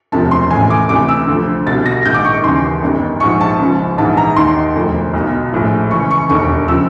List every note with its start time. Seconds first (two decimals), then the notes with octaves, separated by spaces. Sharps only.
0.12 E1 D2 C3 F3 A5
0.31 C6
0.51 A1 A2 E3 G#5
0.70 D6
0.89 D2 C3 E3 D6
1.09 E6
1.27 D2 D3 F3
1.66 C2 B2 A6
1.86 A#6
2.05 A#1 G#2 D#3 G6
2.14 D6
2.25 C#6
2.43 D#2 C#3 E3 C6
2.82 G1 F#2 D#3
3.20 A#1 G#2 F3 C#6
3.41 A5
3.59 C#2 C#3 F3
3.98 A#1 G#2 E3 A5
4.17 A#5
4.36 D#2 D#3 C6
4.75 E1 D2 D3 F3
5.14 B1 B2
5.53 A#1 A2 F3
5.91 C#2 C#3 E3 C#6
6.11 C#6
6.29 E1 D#2 D3 C#6
6.68 C#3 F3 E6